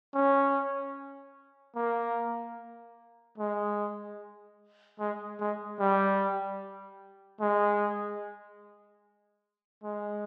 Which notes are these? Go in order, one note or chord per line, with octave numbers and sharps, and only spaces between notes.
C#4
A#3
G#3
G#3
G#3
G3
G#3
G#3